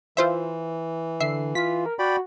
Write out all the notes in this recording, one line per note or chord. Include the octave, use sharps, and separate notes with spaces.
E3 F4 C5 E5
D3 E5 C7
F4 B6
A#4
F#4 D5 G5 B5